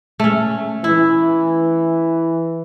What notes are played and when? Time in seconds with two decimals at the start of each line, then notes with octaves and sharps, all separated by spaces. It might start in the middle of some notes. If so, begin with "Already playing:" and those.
0.20 A3 C#4
0.84 E3 E4